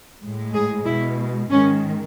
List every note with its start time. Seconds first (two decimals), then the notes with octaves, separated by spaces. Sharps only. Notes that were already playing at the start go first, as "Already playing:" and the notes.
0.22 A2 G#3
0.54 G#4
0.86 B2 G#3 E4
1.50 G#2 D#3 G#3 C#4